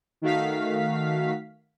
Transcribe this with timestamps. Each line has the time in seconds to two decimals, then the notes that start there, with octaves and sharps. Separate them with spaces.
0.22 D#3 A3 F#4 F5 B6